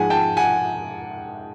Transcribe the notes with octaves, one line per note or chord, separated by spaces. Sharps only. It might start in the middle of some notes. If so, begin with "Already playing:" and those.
Already playing: G#2 F3 G#3 F#5 G#5
G5 A5
F#5 G#5